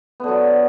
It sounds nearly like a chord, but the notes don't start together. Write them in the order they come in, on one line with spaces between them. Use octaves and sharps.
B3 D3 F#3